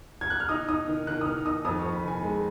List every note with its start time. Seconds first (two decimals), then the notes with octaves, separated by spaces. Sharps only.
0.21 G#6
0.30 F#6
0.40 F6
0.49 D#4 D#6
0.68 D#4 D#6
0.88 D#3
1.07 D#3 F#6
1.21 D#6
1.26 D#3 F6
1.45 D#4 D#6
1.65 F2 D#6
1.79 F2 C#6
1.93 B5
2.04 D#3 G#5
2.22 G#3